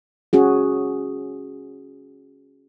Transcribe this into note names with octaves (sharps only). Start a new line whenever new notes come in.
C#4 F#4 G#4